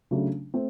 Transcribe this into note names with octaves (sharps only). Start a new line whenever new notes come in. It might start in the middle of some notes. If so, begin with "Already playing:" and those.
C#3 F#3 A3 D4
A3 C4